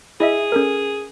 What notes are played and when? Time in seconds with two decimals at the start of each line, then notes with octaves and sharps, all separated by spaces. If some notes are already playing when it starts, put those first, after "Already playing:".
0.20 E4 G#4 D#5 E5
0.52 C#4 A4 A#4